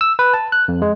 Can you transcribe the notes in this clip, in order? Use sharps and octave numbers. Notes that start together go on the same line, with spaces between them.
E6
B4
A5
F#6
F2
G#3